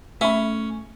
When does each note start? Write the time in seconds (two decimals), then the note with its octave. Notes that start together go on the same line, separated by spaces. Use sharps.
0.21 A3 C#4 E5 B5